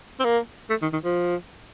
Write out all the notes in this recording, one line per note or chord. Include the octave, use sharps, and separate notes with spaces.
C4
A#3
A3
D#3
D#3
F3